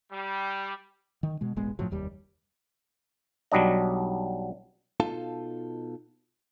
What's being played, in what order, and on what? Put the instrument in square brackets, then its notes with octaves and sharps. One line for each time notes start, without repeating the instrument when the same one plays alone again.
[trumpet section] G3
[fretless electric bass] D#3
B2 G#3
E1 A1 G#3 B3
F#2 A2 F3 F#3
F1 D#2 G3
[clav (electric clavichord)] B1 F#3 G3 D4 D#5
[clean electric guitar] B2 D#4 F4 A4 F5 A5